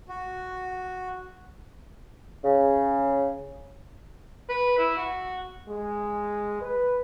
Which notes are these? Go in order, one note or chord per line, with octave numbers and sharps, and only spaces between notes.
F#4
C#3
B4
E4
F#4
G#3
B4